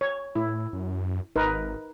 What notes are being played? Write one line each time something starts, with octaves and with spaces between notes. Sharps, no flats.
C#5
A2 E4
F#2
G#1 D#4 A#4 B4